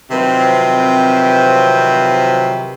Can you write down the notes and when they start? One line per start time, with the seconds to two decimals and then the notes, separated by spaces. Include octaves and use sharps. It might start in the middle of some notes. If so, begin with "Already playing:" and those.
0.11 C3 D#3 F3 F#3 C4 B4